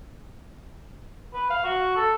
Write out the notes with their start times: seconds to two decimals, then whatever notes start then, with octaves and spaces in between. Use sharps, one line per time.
1.34 B4
1.50 F5
1.64 F#4
1.96 A4